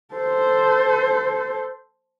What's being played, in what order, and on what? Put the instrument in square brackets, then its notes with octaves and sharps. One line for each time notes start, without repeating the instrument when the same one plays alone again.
[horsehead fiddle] A4 C5